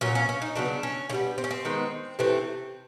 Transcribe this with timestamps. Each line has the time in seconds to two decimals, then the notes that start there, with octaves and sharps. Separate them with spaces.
0.01 A#2 F#3 A#3 C#4
0.15 C#4
0.29 C#4
0.42 D#4
0.55 C#3 F#3 B3 D4
0.83 C#4
1.09 D3 C#4
1.13 G3 B3
1.38 C4
1.44 C#4
1.51 C4
1.65 D#3 G#3 B3
2.19 C3 E3 A3 C4